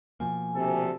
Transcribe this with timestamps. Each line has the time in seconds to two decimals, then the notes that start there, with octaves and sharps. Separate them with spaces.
0.20 B2 F3 A#3 G#5
0.55 D2 C3 A4